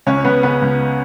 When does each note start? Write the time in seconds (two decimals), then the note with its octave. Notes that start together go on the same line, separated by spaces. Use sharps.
0.06 C#2 C#4 C#5
0.24 C#2 B3 B4
0.43 C#3 B3 B4
0.62 C#2